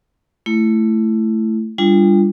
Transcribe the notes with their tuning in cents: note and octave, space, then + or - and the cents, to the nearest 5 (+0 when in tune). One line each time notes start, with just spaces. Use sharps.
A3 +0 E4 +20
G3 +25 D4 +0 F4 -20